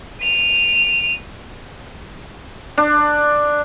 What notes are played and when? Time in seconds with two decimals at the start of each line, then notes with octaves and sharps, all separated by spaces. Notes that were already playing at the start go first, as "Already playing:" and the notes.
0.21 D#7 F7
2.78 D4